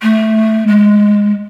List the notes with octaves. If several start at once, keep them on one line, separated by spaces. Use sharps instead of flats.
A3
G#3